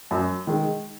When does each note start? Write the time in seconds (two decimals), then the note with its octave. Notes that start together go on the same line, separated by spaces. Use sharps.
0.11 F#2
0.47 D#3 G#3